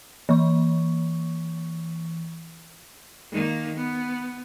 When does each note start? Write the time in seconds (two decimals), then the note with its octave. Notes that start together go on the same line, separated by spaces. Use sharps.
0.29 E3 C#6
3.31 D#3 A#3
3.76 B3